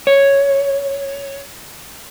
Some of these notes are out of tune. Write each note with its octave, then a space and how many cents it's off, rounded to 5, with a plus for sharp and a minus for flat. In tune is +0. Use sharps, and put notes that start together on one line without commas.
C#5 +0